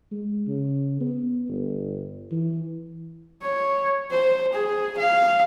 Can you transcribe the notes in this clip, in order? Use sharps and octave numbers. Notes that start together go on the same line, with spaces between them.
G#3
C#3
B3
G1
E3
C#5
C5
G#4
F5